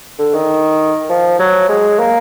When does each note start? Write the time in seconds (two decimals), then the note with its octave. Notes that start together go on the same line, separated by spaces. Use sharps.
0.19 D3
0.34 D#3
1.09 F3
1.39 F#3
1.69 G#3
1.99 A#3